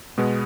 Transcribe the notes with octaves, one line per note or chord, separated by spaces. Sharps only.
B2 G#3 B3